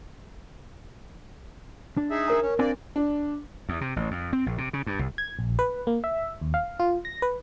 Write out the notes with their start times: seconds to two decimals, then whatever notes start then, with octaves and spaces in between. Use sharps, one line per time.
1.97 D4
2.11 D#4 G#4 E5
2.28 A#4 A#5
2.42 C#4
2.59 A#3 C4 D4 D5 G#5
2.96 D4
3.69 E2
3.81 C3
3.96 A1
4.11 F2
4.33 C4
4.46 A#1
4.58 C3
4.73 C#3
4.86 G2
4.99 C2
5.18 G#6
5.39 A#1
5.59 B4
5.87 A#3
6.04 E5
6.41 D#2
6.54 F5
6.80 F4
7.05 A#6
7.22 B4